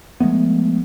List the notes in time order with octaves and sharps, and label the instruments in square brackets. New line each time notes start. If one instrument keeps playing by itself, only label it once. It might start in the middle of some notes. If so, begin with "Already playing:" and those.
[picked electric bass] F3 G#3 A3 B3